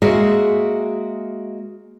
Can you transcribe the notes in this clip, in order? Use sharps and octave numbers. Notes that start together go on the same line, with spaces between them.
G#3 A#3 F#4 G#4 C#5 E5